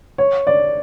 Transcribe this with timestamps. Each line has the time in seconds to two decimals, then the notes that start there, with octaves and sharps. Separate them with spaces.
0.18 C#5
0.47 D5